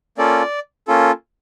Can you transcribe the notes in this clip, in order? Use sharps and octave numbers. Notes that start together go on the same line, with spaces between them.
A#3 C#4 F4 A4 D5
A#3 C#4 F4 A4